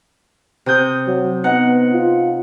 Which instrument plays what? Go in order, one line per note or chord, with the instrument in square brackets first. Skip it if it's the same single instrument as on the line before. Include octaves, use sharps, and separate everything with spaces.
[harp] C3 D#6 G6
[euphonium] F#3
[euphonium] B3 [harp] D#4 F#5
[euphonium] F4